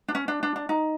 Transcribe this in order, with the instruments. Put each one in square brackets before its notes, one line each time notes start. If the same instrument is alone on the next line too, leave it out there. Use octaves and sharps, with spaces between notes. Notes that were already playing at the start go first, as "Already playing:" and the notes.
[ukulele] D4
C#4
D4
D4
D4
D#4